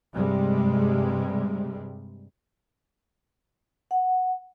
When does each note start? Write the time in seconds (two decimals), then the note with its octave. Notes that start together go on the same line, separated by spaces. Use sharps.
0.13 G2 C3 G3 G#3
3.91 F#5